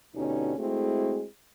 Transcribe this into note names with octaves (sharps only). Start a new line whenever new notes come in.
D2 B2 D3 C#4 D#4 G4
G#3 A3 C4 E4 F#4 G#4